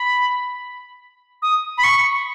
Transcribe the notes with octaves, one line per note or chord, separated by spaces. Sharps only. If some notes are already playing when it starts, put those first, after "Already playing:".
Already playing: B5
D#6
B5
C#6